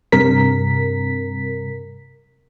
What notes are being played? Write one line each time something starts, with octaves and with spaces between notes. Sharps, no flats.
G2 C3 A#4 B6